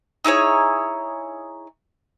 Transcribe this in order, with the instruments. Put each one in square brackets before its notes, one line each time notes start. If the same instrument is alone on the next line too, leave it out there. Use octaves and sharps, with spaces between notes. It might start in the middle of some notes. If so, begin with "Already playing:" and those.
[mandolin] D#4 E4 G#4 C#5